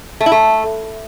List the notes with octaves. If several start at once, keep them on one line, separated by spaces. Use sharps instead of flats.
A3
E4
A3